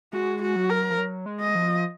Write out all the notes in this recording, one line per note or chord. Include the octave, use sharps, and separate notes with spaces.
G#3 F#4
F#4
F#3
A#4
F3
F#3
G#3
D#5
F3